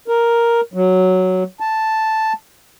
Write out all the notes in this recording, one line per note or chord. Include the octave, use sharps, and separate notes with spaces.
A#4
F#3
A5